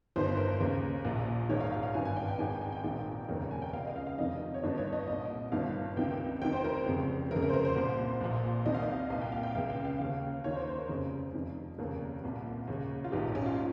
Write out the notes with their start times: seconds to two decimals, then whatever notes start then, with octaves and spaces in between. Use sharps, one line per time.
0.16 G1 G2 D#3 C5
0.37 A#4
0.60 D#2 C#3
1.05 A#1 A#2
1.49 A#1 G#2 D#3 C#5
1.61 F5
1.72 F5
1.83 F5
1.94 G#1 G2 D#3 G#5
2.05 G#5
2.16 G5
2.28 G5
2.39 G#1 G#2 D#3 G#5
2.50 G5
2.61 G#5
2.72 G5
2.84 A#1 G#2 D#3
3.29 F1 D#2 C#3 A#4
3.40 A#4
3.51 G#5
3.62 G5
3.73 C#2 C#3 F5
3.85 D#5
3.96 F5
4.07 F5
4.18 F1 F2 C3 D#3 D#5
4.54 C#5
4.63 G1 G2 D#3 D#5
4.78 C#5
4.93 D#5
5.07 C2 A#2 D#5
5.52 G1 G2 D#3 F5
5.96 C#2 C3 D#3 G5
6.42 F1 F2 D#3 G5
6.53 C5
6.64 A#4
6.86 F1 F2 C#3
7.31 F1 F2 C#3 A#4
7.42 A#4
7.49 C5
7.53 A#4
7.65 C5
7.76 C2 A#2
8.21 A#1 A#2
8.66 C2 C3 D#3 D#5
8.74 F5
8.83 D#5
9.10 C2 A#2 F5
9.21 G5
9.32 F5
9.43 G5
9.55 C#2 C#3 F5
9.70 G5
9.85 F5
9.99 D#2 C#3 F5
10.44 D#2 D#3 C#5
10.55 C5
10.67 C5
10.78 A#4
10.89 F1 F2 C#3
11.33 F1 F2 D#3
11.78 F1 D#2 C#3 A#4
12.24 C2 A#2
12.67 D#2 C#3
13.04 F4
13.12 A#1 G#2 D#3 G4
13.35 C#4
13.46 F4